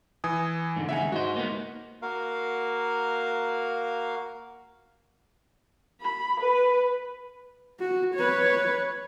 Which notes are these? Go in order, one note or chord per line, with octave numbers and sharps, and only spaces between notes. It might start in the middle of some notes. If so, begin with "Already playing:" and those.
E3 G#5 D#6
G#2 D3
D#2 C#3 D#4 E5 F#5 G#5
G#2 F#4 C5 D#5
A#3 B3 D#4
A#3 F#4 A#4 F5
B5
B4
F#4
B4 C#5